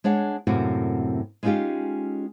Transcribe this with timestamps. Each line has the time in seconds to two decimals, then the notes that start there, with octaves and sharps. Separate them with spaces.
0.04 G#3 D4 C#5 F#5
0.47 F#2 A2 C3 A#3 C4 F#4
1.43 G#3 B3 C#4 D#4 F4 G4